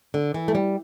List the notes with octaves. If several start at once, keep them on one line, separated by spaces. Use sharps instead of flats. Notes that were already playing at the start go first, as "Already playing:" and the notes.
D3
E3
A3
G3